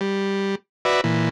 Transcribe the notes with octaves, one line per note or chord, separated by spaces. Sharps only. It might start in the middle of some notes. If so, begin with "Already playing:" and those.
G3
F#4 B4 D5 E5
A#2 E3